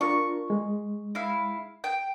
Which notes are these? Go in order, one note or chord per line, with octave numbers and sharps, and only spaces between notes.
D4 F4 A#4 C#6
G#3
E4 F5
G5